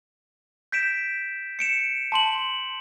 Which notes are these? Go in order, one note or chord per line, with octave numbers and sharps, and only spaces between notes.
G6 B6 D7 E7
C#7 D7 E7
A5 C6 F#7